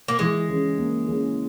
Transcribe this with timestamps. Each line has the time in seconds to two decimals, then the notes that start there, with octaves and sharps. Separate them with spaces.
0.08 A#3
0.19 E3 G#3
0.48 C#3
0.77 A#3
1.08 C#3